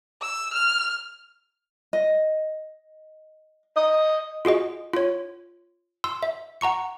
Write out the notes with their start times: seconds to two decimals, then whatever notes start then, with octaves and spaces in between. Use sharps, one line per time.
0.22 E6
0.54 F6
1.93 D#5
3.76 D#5
4.45 F4 F#4 G#4 D#5
4.93 F4 C#5
6.04 C6 E6
6.23 E5
6.61 F#5 A#5 C#6 C#7